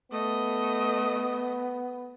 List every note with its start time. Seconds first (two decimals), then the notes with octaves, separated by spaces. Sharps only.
0.11 A3 B3 D#5